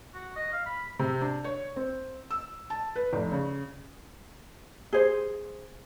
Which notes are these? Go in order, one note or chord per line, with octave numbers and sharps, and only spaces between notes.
F#4
D#5
F5
B5
C3
D4
C#5
C4
E6
A5
B4
F1
C#3
G#4 C5